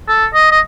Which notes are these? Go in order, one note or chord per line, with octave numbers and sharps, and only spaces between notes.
A4
D#5
D#5